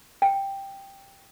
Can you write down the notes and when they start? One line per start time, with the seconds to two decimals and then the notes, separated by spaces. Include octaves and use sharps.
0.22 G5